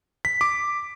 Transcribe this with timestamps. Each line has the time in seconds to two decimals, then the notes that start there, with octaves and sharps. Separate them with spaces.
0.25 B6
0.41 D6